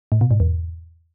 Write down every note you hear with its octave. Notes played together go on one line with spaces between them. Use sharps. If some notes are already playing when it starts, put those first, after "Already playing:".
A2
B2
G#2
E2